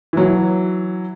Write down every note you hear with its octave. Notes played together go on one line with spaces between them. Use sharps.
E3 F#3